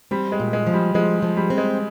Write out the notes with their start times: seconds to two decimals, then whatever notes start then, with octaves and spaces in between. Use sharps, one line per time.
0.11 G3 C4
0.32 G#3
0.40 A#2
0.53 G#3
0.67 F3
0.73 G3
0.95 F3 G#3
1.22 F3
1.37 G3
1.50 C4
1.58 G#3